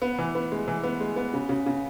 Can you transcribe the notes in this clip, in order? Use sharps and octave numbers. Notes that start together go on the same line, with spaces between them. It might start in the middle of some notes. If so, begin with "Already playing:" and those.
B3
E3
B3
G#3
E3
B3
G#3
B3
C#3
C#3
C#3